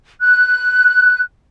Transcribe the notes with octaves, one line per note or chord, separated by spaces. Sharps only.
F#6